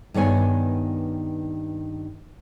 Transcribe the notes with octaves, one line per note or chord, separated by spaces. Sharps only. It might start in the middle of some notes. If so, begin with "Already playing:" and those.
G2 D#3 B3 C#5 G#5